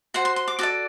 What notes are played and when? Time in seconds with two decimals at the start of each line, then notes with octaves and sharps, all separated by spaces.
0.14 F#4 C5 F#5
0.25 C6
0.36 C6
0.48 D6
0.59 F#4 A4 D5 D6